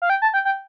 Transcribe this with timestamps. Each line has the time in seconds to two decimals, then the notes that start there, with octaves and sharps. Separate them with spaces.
0.02 F5
0.10 G5
0.22 A5
0.34 G5
0.45 G5